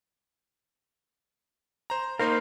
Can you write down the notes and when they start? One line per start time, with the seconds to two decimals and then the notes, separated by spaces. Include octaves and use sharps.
1.90 C5 A#5
2.19 A#3 D#4 A#4 C5 F5